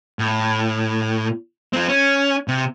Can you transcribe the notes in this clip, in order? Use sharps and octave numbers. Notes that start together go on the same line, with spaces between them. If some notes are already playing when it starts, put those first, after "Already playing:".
A2
F3 C4
C#4
C3